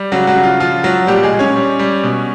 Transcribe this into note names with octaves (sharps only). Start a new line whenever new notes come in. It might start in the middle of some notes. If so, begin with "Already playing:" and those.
Already playing: G3
C#3 F#3 F#4
F#3 F#4
C#3
F4
F3 F4
F3 F#3 F#4
A#2 G3 G4
G#3 G#4
A#2
C#4 C#5
G3
G3
B2